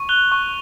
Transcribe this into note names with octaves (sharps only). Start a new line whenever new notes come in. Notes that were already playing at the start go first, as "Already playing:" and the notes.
Already playing: C#6
F#6 F7 G7
C#6